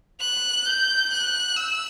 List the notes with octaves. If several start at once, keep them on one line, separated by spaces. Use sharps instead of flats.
F#6
G6
F#6
E6